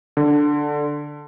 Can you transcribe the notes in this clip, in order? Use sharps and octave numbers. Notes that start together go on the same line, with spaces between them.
D3